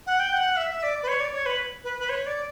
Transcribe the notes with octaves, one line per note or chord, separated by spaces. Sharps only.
F#5
G5
F#5
E5
E5
D5
B4
C#5
D5
C#5
B4
B4
B4
C#5
D5